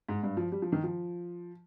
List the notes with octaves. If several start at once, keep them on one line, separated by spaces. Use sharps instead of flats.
G#2
G2
F3
G3
F3
D#3
F3